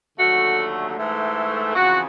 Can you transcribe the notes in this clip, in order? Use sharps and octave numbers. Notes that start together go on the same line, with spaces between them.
D#2 D3 F#3 A3 F#4
G#2 E3 A3
F2 C#3 E3 F#4